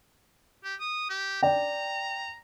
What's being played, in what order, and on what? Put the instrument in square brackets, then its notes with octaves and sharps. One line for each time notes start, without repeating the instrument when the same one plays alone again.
[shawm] G4
D#6
G4
[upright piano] D5 G5 [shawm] A#5